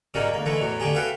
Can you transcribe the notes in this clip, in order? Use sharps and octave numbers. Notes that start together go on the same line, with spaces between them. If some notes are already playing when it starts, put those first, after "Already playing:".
G#2 C#3 F#3 G3 A#3 C#4
D2 A#3
D3 E3 G#3 A3
E2 A2 F#3
D3 A3 G4 G#4
F#4 A4 B4 E5 F5 G5